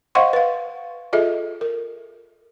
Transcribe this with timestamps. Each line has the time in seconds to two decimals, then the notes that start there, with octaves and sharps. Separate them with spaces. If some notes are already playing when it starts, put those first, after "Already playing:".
0.15 C5 D#5 F5 F#5 C6 C#6
0.33 B4 F5
1.13 F4 G#4 A4 D#5 E5
1.61 A#4